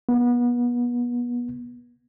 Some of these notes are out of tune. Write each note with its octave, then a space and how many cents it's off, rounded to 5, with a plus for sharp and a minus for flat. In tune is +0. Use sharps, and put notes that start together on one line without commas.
B3 -30